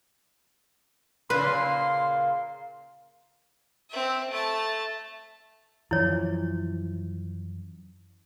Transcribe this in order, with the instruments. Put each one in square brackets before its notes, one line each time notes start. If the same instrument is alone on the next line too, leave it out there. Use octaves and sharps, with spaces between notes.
[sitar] A#2 C#3 A#3 [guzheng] B4 [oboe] C6
[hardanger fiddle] C4 E5
A3 A5
[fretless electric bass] F#2 E3 F3 [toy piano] E4 C#5